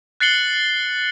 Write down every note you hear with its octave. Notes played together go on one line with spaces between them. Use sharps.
F#6 A6 C7 C#7 F#7 G7